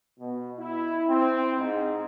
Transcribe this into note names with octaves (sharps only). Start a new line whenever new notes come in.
B2
E4
C4
G#2